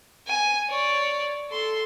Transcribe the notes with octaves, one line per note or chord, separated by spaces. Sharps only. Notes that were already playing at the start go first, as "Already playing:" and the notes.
G#5
C#5 D5
A4 C6